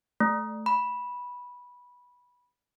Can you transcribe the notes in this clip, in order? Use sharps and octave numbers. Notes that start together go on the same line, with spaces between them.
A3
B5